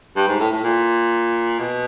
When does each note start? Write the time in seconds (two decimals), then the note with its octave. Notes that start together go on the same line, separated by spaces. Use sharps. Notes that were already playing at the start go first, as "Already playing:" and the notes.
0.16 G2
0.28 G#2
0.40 A2
0.52 A2
0.64 A#2
1.59 B2